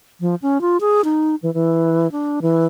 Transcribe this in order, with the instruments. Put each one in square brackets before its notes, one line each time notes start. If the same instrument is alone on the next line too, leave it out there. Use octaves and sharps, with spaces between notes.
[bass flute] F3
C#4
F4
G#4
D#4
E3
E3
D4
E3